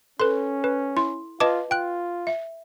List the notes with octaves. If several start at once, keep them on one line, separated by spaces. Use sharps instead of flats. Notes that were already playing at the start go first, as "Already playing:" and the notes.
C#4 A4 B4 C6
B4
E4 C6
F4 B4 D#5 A5 D6
F4 G5 F#6
E5